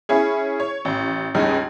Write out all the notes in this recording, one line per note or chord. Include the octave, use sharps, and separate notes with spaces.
C#4 E4 G#4
C#5
A1
C#2 G2 C#3 D#4